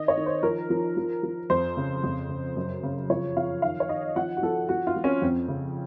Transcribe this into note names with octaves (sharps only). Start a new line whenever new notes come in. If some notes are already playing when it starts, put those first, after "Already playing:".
Already playing: D#3 D#5
C#5
D#3
C5
F3 A#4
F3
F3
F3
F2 C5
C#3
F2
C#3
F#2
C#3
F3 C#5
F3 F5
D#3 F5
C#5
D#3 D#5
F3 F#5
F#4
F3 A4
F3 F#4
F4
F3
C#4
F2 C4
C#3